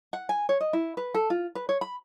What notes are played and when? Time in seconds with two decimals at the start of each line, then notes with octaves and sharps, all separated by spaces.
0.13 F#5
0.29 G#5
0.49 C#5
0.61 D#5
0.73 E4
0.97 B4
1.14 A4
1.30 F4
1.55 B4
1.69 C#5
1.81 B5